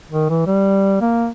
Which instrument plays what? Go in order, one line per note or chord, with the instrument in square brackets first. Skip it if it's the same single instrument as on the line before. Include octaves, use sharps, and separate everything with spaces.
[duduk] D#3
E3
G3
A#3